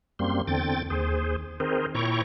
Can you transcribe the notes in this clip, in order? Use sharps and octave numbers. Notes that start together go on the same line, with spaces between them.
F#2 G3 A#3 C4 C6
E2 D3 C4 G5 A6
D#2 G#4 C5
D#3 C4 G#4 A#4 C5
A#2 E4 C#5 G5 A#5 C#6